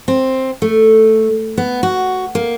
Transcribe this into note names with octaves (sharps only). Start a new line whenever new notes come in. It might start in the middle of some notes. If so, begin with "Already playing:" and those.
C4
A3
B3
F#4
A#3